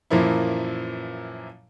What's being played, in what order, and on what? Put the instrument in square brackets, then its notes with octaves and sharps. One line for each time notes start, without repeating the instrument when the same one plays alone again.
[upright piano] F#2 A#2 E3 F3 A#3 E4